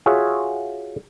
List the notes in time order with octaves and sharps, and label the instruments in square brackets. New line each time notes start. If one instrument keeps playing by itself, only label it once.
[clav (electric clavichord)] F4 F#4 G#4 C#5 E5